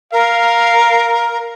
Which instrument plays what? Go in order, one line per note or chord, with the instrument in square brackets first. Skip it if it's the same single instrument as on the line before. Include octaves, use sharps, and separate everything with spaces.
[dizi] A#4 [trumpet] F5